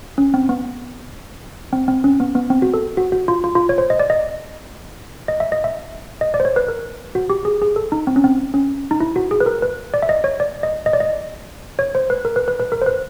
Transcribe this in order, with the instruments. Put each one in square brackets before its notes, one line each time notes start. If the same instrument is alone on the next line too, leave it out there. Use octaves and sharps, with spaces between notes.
[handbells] C#4
C4
B3
C4
C4
C#4
B3
B3
C4
F#4
A4
F#4
F#4
F4
F4
F4
C#5
C5
D#5
D5
D#5
D#5
E5
D#5
E5
D#5
D5
C5
C#5
B4
A#4
F#4
G4
G#4
G#4
A4
D#4
C4
C#4
C4
C#4
D#4
E4
F#4
G#4
B4
A#4
B4
D5
E5
D#5
C#5
D5
D#5
D#5
D5
D#5
C#5
C5
B4
A#4
B4
B4
B4
A#4
C5
B4